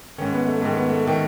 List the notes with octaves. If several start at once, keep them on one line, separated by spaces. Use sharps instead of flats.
G#2 D#3 C#4
B3
A3
G#2 D#3 A3
B3
A3
D#3 A3